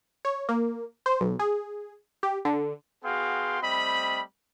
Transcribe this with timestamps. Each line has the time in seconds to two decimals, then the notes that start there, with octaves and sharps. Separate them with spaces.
0.25 C#5
0.49 A#3
1.06 C5
1.21 B1
1.39 G#4
2.23 G4
2.45 D3
3.04 B3 F#4 G#4 F5 G5 C6
3.62 G3 A3 C4 D#5 B5